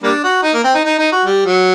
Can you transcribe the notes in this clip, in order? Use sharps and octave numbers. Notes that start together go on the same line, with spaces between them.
G3 A#3 D4
F#4
D#4
A#3
C4
D#4
D#4
D#4
F#4
G3
F#3